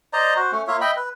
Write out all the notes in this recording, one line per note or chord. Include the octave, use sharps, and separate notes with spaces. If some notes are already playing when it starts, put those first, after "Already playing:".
C5 D5 D#5 A#5
F#4 C5
A3 C#4
A#3 F4 C#5 E5
D#5 E5 G5 B5
B4